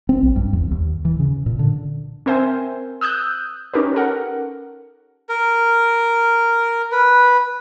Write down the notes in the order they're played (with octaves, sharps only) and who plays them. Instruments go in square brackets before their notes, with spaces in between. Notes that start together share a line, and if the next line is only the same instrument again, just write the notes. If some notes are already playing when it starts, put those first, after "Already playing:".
[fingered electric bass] C4
B1
G2
E2
D#2
E3
C#3
A#2
D3
[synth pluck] C4 A#4 C5 E5 G#5
D#6 E6 F#6 G6
C#4 D#4 G4 A#4 B4
A4 A#4 F#5
[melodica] A#4
B4